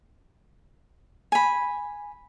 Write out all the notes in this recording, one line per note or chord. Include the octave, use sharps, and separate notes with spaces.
G#5 B5